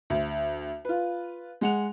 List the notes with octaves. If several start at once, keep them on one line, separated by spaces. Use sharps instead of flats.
D2
F4 B4
G#3 F#5 F7